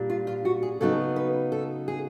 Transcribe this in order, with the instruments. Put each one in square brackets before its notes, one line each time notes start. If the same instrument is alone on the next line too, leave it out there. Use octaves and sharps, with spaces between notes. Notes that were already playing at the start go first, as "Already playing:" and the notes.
Already playing: [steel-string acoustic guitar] A#2 G3 D4
F4
F4
F#4
G#4
C#3 F#3 B3 D#4 A4
B4
A4
G#4